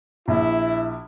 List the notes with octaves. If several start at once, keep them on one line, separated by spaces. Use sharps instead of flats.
A#1 E4